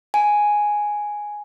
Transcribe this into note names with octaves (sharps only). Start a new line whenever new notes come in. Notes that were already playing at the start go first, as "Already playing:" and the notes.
G#5